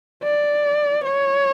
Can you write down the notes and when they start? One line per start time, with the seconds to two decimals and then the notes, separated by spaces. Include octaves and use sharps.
0.23 D5
1.04 C#5